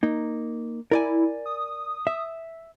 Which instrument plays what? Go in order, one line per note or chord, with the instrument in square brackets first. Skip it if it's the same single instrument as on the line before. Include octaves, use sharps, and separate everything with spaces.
[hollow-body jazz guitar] A#3 D#4
[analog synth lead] E4 [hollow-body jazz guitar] A#4 D5 G#5
[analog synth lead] D#6
[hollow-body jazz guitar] E5